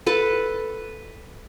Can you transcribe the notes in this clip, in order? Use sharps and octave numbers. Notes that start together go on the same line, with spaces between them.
A4 B4 A5